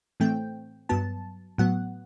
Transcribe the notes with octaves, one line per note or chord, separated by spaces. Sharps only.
A2 E3 A3 C4 G5
G2 F#3 B3 A5
A2 F#3 B3 F#5